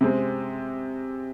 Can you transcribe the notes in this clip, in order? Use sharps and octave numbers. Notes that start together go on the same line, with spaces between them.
C3 G#3 C4